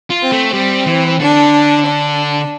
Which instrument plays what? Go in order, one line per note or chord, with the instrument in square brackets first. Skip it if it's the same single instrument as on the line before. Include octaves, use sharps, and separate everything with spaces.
[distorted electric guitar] F4
[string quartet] C4
[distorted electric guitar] A3
[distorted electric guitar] G3 [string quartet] C4
[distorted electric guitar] E3
[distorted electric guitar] D3 [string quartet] D4
[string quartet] D4